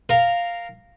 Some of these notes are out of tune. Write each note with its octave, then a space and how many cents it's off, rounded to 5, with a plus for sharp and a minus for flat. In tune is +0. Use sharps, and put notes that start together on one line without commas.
A#4 -10 F5 +0